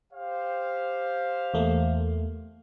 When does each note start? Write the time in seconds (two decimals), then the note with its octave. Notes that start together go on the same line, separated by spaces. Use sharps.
0.12 G4 C5 F5
1.54 E2 A3 A#3